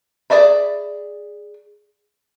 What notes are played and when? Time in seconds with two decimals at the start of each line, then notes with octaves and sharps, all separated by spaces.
0.30 G#4 C5 D5 E5 B5